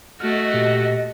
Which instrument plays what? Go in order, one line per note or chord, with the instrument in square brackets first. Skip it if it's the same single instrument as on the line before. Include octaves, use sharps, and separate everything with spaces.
[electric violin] A3 F#4 [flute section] D#5 [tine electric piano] F6
[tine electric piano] A#2 G4